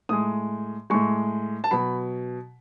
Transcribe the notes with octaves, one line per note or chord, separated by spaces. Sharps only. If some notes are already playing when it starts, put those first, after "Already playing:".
A2 G#3 D#6
A2 G#3 C#6
A5
B2 F#3 B5